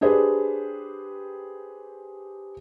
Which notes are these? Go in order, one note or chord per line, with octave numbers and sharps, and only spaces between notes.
D4 G4 G#4 B4 C5